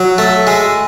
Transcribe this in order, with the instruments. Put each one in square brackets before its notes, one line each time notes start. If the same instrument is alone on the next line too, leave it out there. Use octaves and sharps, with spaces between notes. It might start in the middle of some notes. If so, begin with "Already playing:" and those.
Already playing: [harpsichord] F#3
A3
G#3